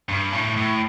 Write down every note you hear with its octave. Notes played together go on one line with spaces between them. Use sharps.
G2
A2
A2